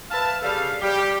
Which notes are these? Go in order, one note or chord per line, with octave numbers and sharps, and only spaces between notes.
B4 E5 F5 A5
C#3 G3 A4 F5
G3 G4